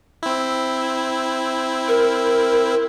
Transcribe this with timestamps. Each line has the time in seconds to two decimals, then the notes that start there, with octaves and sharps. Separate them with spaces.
0.23 C4 E4
1.88 A#4